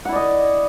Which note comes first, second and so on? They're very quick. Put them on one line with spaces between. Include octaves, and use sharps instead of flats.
F#5 E4 D5 D#5